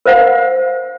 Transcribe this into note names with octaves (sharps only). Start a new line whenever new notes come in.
A#4 C5 F5 F#5